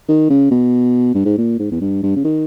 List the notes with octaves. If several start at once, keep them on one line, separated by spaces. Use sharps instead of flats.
D#3
C#3
B2
G2
G#2
A#2
G#2
E2
G2
G2
C#3
D#3